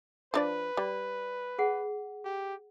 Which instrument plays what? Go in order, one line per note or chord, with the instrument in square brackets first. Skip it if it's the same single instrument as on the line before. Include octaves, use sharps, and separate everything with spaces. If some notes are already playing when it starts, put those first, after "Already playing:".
[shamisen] F3 D4 D5 [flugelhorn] B4
[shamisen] G3 [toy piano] D5
[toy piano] G#4 F#5
[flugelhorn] G4